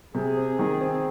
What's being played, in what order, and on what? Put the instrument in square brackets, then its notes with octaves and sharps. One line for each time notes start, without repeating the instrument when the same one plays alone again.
[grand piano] C3 [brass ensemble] G#4
[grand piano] C4
D#3
C4